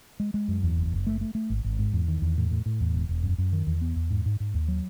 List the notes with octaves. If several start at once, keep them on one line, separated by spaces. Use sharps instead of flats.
G#3
G#3
F#2
E2
F#1
F#1
A3
A3
A3
G#1
G#1
G#2
E2
D#3
E2
A2
A2
A2
E2
E1
E1
F#2
F#2
D#3
E2
B3
E2
G#2
G#2
G#2
D#2
F#3